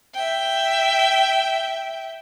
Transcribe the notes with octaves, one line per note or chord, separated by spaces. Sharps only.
E5 G5